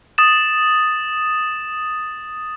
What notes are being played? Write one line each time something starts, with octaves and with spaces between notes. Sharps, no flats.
D#6 A6 E7